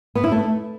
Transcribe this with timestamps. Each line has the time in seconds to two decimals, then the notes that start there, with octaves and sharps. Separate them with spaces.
0.15 B3
0.24 E4
0.32 A3